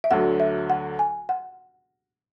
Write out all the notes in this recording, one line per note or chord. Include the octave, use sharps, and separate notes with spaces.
E5
D2 D3 F#3 F#5
E5
F#5
G#5
F#5